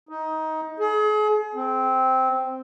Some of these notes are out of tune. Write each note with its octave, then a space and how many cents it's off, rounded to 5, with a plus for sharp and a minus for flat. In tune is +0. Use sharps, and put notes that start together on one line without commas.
D#4 +20
G#4 +35
C4 -5